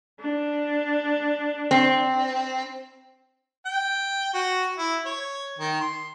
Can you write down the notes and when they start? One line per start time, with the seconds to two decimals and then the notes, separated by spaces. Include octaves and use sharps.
0.20 D4
1.71 C4
3.66 G5
4.34 F#4
4.78 E4
5.05 C#5
5.59 D#3
5.81 C6